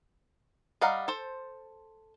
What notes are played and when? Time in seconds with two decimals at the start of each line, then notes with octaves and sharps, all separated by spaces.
0.81 G3 D#5 F5 F#5 A#5
1.08 A4 C5